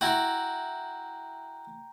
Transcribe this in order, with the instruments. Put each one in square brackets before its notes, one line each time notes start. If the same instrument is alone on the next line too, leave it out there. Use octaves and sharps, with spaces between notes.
[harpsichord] E4 F#4 [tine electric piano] G5 A#5